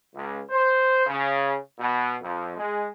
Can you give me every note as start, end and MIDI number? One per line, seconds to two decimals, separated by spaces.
0.14 0.40 37
0.49 1.02 72
1.06 1.54 49
1.79 2.14 47
2.21 2.57 41
2.57 2.85 56